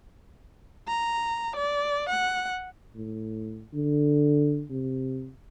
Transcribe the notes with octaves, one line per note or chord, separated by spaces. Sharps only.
A#5
D5
F#5
A2
D3
C3